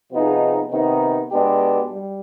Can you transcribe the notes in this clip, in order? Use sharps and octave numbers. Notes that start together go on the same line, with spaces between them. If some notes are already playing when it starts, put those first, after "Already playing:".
C3 F3 B3 D#4 G#4
C3 D#3 B3 D#4
B2 G#3 B3 D4 G4
G3